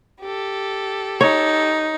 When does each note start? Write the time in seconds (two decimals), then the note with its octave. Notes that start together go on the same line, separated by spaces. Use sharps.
0.21 G4 A4
1.21 D#4 C#5